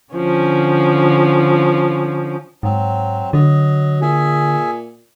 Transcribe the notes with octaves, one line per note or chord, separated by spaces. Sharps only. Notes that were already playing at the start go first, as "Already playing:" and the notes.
D3 F3 C#4
G#2 F#3 C4
D3 F#3 D#5
A#2 G#4 E5 G#5